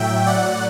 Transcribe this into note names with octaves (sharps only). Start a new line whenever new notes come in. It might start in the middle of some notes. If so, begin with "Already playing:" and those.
Already playing: A2 F#3 E5 G5
D5 F#5